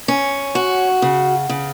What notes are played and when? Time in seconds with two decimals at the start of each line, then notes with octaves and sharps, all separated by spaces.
0.08 C#4
0.55 F#4
1.02 C#3
1.49 C#3